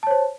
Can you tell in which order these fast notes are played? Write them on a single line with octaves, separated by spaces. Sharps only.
A5 C#5 C5